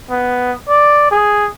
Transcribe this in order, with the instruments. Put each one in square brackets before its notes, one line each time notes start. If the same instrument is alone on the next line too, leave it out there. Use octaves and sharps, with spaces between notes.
[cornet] B3
D5
G#4